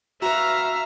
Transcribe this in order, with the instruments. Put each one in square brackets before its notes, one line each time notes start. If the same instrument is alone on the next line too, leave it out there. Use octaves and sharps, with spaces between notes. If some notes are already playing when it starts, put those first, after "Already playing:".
[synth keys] F#4 B4 [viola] E5 F5 [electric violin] A#5